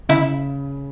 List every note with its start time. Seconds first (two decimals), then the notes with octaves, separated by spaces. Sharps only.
0.09 C#3 E4